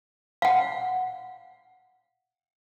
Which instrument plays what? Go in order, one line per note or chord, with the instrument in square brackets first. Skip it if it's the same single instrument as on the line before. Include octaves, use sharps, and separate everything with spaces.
[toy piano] F5 F#5